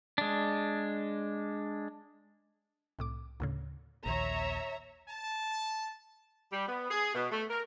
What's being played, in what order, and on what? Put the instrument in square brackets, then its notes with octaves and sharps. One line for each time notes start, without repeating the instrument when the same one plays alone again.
[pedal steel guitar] G#3 D4
[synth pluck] C2 A2 D6
D2 A2 C#3
[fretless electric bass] A#1 D#2 [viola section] C#5 E5 A#5
[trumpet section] A5
[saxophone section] G3
B3
G#4
B2
A3
A#4